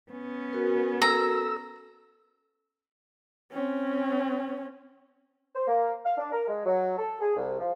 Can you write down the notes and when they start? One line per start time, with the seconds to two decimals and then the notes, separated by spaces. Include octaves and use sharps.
0.12 B3 C#4
0.53 F#4 A#4
1.02 A4 A#5 E6
3.52 C4 C#4
5.55 C5
5.68 A#3
6.05 F5
6.18 D4
6.32 A#4
6.47 G#3
6.66 F#3
6.98 A4
7.21 G#4
7.36 C2
7.60 F3